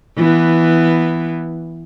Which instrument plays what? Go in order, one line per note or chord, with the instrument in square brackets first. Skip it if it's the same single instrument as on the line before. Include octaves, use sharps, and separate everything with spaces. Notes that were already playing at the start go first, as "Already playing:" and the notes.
[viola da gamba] E3 B3